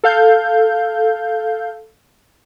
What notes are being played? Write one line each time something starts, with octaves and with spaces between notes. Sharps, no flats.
A4 F5 G6